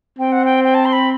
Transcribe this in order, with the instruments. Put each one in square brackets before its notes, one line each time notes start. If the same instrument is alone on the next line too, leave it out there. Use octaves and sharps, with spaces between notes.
[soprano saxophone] C4 [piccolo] G5
[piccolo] F#5
G5
G5
A5
C6
B5